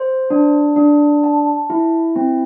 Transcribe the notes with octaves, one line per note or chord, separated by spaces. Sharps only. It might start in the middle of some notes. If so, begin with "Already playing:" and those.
Already playing: C5
D4
D4
A5
E4
C4